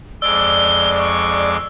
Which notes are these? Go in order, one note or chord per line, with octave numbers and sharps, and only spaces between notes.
F2 G#3 D5 D6 E6 G7
C#6